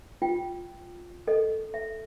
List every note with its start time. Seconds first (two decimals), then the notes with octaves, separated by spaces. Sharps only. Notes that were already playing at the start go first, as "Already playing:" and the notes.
0.22 F4 G5
1.27 A4 D#5
1.74 E5